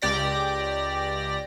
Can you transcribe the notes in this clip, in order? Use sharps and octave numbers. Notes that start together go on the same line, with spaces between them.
C#2 G4 D5 A#6